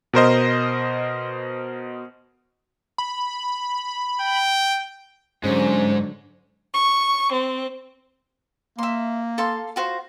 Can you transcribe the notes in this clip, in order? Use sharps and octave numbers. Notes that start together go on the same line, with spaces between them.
B2 A#4 C5 D#5
B5
G5
G#2 D3 F#3 G#3 C#4 C5
C#6
C4
A#3 E5 C6
A4 F5 C6
F4 F#4 C5